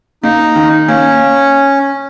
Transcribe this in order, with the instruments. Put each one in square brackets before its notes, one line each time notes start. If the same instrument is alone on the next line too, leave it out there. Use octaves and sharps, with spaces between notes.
[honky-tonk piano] A#3 [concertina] D#4
[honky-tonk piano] D#3
[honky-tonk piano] A#3 [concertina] C#4